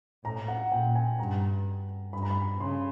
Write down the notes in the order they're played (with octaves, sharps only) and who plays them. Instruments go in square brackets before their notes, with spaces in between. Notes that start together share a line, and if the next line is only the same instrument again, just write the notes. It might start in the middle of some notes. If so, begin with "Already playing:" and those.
[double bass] A2 [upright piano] A#5
[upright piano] F#5
[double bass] A#2 [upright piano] G5
[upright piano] G#5
[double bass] G2 [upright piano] A#5
[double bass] G2 [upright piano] B5
[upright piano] A#5
B5
[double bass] C#3 [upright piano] C6